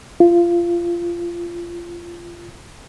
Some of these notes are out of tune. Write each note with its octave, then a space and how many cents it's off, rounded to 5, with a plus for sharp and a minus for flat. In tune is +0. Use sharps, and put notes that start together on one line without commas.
F4 -20